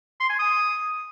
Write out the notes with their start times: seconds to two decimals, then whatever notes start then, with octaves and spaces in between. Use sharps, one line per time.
0.20 C6
0.30 G#5
0.39 D#6